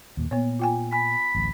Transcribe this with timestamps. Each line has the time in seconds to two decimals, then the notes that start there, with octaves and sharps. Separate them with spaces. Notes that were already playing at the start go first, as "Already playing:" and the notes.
0.17 D#2 A#2 A#3
0.31 A#2 B3 C#5
0.59 F4 G5 G#5
0.92 G#5 B5
1.35 D1 A1